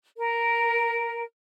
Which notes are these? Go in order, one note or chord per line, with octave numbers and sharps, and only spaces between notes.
A#4